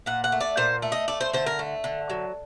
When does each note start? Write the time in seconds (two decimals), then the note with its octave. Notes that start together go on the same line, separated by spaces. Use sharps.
0.06 A#2 F#5
0.24 F#5
0.32 A3
0.40 D5
0.57 A#2 C5
0.82 A3
0.92 D#5
1.08 A3 D5
1.21 C5
1.33 D3 C5
1.47 A#4
1.59 A3
1.84 D3
2.10 F#3